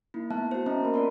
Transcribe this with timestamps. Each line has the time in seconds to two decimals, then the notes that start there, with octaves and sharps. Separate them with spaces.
0.14 A#3 D#4 E4
0.30 A3 B3 E5 A5 F#6
0.51 F#4 C5
0.66 C4 C#4 D#5 E5 A5 A#5
0.81 A#3 B3 A#4 B5
0.94 F4 A#4 D5 C6